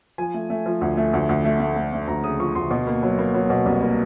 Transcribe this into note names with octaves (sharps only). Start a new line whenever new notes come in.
F3 G#5
A3
A3
F3
D2
A3
D2
D2
A3
A3
A3
A3
D2 A#5
C#3 D#6
F3 C#6
D2 C6
B2
A#3
F#3
A#3
F#3
B2
C2
A#3